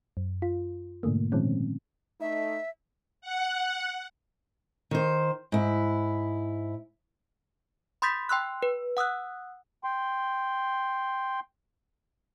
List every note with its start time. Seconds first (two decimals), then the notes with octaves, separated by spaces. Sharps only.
0.17 F#2
0.42 F4
1.03 G#2 B2 D3 A3 A#3
1.32 A#2 D#3 F3 G#3 C4 C#4
2.21 A3 D#4 E5
3.21 F#5
4.91 D#3 C5
5.52 G#2 E4
8.02 B5 C6 D#6 G6 A6 B6
8.29 G5 C6 E6 F#6
8.63 B4
8.97 F#5 D#6 E6 F#6
9.84 G5 C6